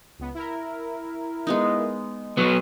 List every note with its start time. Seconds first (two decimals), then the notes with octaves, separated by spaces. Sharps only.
0.18 C#2 B3
0.34 E4 A#4
1.47 G#3 B3 D#4
2.37 F#3 B3